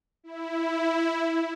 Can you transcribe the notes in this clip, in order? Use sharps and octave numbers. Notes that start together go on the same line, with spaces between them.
E4